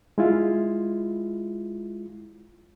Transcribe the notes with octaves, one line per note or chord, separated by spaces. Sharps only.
G#3 E4 F4